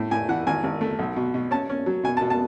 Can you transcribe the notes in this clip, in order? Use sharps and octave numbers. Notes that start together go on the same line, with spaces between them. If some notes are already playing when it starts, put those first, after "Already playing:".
Already playing: A2
A2 G#5
E3 F#5
G#1 G#5
G#1
A3
B1
B2
B2
C#4 A5
C#4
F#3
B2 G#5
A5
B2
A5